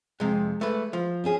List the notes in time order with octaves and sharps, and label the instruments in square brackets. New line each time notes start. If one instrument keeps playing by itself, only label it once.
[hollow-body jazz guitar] F2 C3 [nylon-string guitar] G#3
[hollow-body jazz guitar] A3 B4
F3
[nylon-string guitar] C4 C#4 G#4